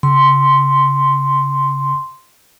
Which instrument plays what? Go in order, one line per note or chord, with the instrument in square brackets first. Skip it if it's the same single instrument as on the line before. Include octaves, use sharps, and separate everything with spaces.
[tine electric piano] C#3 [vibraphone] C6